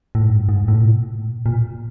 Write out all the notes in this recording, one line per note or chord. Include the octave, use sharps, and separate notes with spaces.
A2
G#2
G2
G#2
A2
B2
A#2
A#2